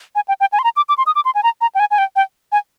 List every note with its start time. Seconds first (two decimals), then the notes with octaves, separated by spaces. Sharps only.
0.15 G#5
0.28 G5
0.40 G5
0.53 G#5
0.59 C6
0.64 A#5
0.76 D6
0.89 D6
0.98 C6
1.06 D#6
1.16 D6
1.25 C6
1.35 G#5
1.43 A#5
1.61 A#5
1.75 G5
1.80 G#5
1.91 G#5
1.98 G5
2.16 G5
2.52 G#5